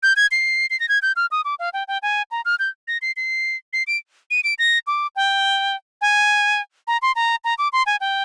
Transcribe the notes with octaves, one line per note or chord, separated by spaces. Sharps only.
G6
G#6
C7
C7
A#6
G#6
G6
F6
D#6
D6
F5
G5
G5
G#5
A#5
F6
G6
A#6
C7
C7
C7
D7
D#7
D7
A#6
D6
G5
G#5
A#5
C6
A#5
A#5
D6
C6
G#5
G5